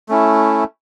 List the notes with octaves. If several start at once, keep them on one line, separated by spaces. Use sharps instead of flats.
A3 C#4 E4